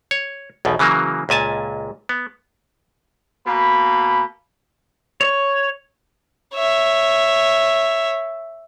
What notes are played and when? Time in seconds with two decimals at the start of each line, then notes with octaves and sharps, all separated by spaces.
0.11 C#5
0.65 B1 E2 B2
0.79 C#3 E3 F#3 A#3
1.29 C#2 A#2 G#5 A5
2.09 B3
3.46 B2 A#3 B5
5.21 C#5
6.54 C#5 E5